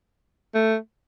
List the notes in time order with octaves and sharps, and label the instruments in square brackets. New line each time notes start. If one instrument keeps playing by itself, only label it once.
[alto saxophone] A3